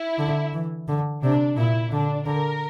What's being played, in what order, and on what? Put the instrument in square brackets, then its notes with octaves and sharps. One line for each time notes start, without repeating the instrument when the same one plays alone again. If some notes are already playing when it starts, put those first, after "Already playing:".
Already playing: [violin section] E4
[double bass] D3
E3
D3
[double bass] C3 [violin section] D4
[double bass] A#2 [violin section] E4
[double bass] D3 [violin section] D4
[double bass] D3 [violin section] A#4